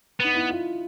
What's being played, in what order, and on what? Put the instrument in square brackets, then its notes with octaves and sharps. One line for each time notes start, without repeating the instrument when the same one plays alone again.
[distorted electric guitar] B3 [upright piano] D#4
[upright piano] E4
F4